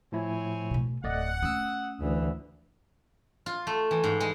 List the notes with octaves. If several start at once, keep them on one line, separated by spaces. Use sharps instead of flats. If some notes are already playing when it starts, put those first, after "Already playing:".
A2 F3 C4 E4 C#5 G#5
B2 A3
D1 A3 D5 D#5 F#5
A3 C#4 D#6 E6
D2 E3
F4
A3
E3
G#2
G#3